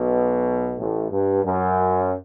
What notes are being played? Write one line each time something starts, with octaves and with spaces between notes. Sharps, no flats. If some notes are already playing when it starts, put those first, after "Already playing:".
Already playing: B1 B2
A1 A2
G2
F#2